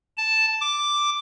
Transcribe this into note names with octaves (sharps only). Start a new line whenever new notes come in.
A5
D6